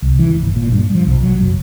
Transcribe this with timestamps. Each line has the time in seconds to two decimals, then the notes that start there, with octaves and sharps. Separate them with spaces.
0.02 C2
0.19 E3
0.30 F1
0.43 G1
0.56 A#2
0.72 G2
0.95 F3
1.07 B1
1.23 F#3
1.41 F#1